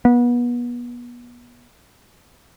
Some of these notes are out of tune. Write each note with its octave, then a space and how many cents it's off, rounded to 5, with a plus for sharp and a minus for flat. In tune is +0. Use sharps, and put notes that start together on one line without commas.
B3 -30